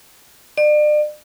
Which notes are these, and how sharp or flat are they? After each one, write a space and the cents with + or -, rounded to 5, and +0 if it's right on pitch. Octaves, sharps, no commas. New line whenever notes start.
D5 +35